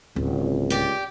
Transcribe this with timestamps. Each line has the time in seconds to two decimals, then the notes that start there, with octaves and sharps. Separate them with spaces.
0.16 D1 C#2
0.70 G4 D5